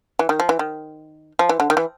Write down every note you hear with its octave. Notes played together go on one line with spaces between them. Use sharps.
E3
D#3
F3
E3
D#3
F3
E3
D3
D#3
E3